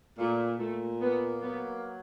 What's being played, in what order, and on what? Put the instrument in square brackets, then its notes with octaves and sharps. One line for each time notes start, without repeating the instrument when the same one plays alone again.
[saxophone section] A#2 [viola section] A3
[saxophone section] A#2 [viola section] A3
[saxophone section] A#3 [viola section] B3
[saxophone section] F#3 [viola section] B3